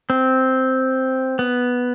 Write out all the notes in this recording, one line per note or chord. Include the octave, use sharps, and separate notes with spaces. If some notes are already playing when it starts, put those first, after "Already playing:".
C4
B3